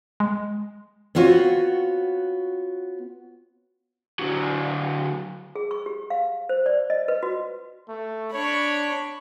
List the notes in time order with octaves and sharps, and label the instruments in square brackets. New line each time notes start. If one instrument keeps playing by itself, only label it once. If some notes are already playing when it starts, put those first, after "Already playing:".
[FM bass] G#3
[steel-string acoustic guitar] B3 C4 F4 F#4 C#5
[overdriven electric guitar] D3 F#3
[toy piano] G#4
C#6
G4
F5
C5
D5
D#5
B4
F#4
[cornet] A3
[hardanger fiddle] D4 B5 [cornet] C#5